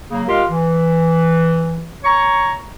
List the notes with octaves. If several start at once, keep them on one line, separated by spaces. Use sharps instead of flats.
C#3 F#3 A#3
G#3 F4 G4 A#4 F5
E3
C#5 A#5 C#6